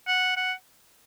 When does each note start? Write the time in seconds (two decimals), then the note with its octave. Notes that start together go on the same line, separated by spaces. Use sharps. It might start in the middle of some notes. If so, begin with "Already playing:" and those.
0.07 F#5
0.37 F#5